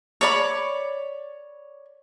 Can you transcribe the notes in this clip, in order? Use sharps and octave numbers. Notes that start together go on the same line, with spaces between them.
C#5 D5 B5